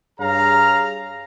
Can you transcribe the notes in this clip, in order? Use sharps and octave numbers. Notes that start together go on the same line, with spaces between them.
G2 G#4 C#5 F5 A#5